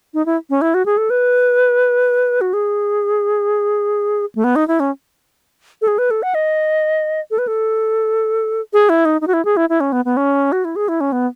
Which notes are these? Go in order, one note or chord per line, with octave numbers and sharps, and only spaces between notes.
D#4
E4
C#4
E4
F#4
G#4
A4
B4
F#4
G#4
A3
B3
D#4
E4
C#4
A4
G#4
B4
A4
F#5
D#5
A4
B4
A4
G#4
E4
D#4
D#4
F#4
E4
G#4
E4
E4
C#4
B3
B3
C#4
F#4
E4
G#4
E4
C#4
B3